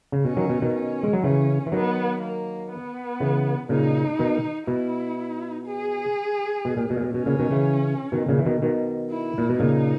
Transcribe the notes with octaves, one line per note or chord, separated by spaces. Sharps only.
C#3
B2 C#4
D#3 F#3
B2
B2 D#3
C#4
G#3
F#3
C#3 E3 C#4
E3
D#3 F#3 B3
A#3
B3
C#3 E3
A#2 C#3 D#4
B2 D#3
B2 E4
G#4
B2
A#2
B2
A#2
B2
B2 C#4
A#2 C#3
B2 D#3
C#3 E3
B2 D#3
A#2 C#3
E3
B2 D#3
B2 D#3
E4
A#2
B2
A#2 C#3 D#4